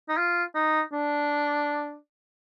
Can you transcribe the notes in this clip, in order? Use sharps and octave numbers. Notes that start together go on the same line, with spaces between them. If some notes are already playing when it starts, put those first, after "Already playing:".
D#4
F4
D#4
D4